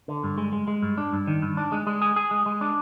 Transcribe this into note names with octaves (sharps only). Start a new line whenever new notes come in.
D3
G2
G#3
G#3
G#3
G2
D4
G2
D#3
G2
D4
G#3
G#3
G#4
G#4
G#3
G#3
D4